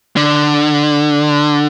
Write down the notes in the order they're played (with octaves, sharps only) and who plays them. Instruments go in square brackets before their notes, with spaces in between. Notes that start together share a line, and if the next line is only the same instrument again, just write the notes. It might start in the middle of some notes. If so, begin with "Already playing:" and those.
[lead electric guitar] D3